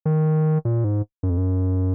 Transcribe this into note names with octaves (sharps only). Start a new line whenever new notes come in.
D#3
A#2
G#2
F#2
F2
F#2